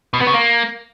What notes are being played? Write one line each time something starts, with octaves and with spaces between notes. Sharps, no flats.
B2
B3
C#3
A#3